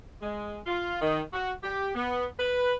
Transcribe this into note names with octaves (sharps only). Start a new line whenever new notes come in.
G#3
F4
D#3
F#4
G4
B3
B4